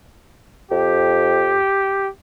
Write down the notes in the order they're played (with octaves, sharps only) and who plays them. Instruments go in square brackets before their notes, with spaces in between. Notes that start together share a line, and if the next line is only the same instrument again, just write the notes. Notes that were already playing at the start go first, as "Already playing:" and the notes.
[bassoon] F2 [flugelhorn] G4